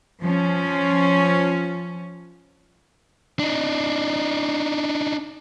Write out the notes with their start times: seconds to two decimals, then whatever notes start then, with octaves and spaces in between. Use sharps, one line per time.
0.22 F3 C#4
3.39 D4 D#4